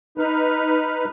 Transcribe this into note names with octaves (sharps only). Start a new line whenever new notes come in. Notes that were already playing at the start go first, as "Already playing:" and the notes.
D#4 B4 F6